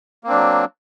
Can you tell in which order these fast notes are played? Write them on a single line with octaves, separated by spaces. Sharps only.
A#3 C4 D4 F#3